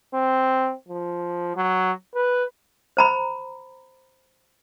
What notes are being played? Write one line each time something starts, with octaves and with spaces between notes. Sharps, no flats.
C4
F3
F#3
B4
C5 A#5 B5